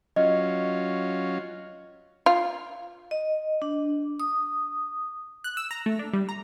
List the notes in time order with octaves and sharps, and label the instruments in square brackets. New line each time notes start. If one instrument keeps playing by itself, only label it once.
[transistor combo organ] F#3 C#4 F4 [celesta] D#5
[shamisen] F4
[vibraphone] D#5
D4
D#6
[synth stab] F#6
E6
A#5
A3
D4
G3
A#5